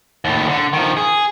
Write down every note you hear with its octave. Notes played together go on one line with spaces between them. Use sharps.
D#2 A2
D3
D#3 F3
G#4